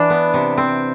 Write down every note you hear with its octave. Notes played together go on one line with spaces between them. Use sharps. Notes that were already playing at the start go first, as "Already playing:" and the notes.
Already playing: E3 D4
B3
C3
C4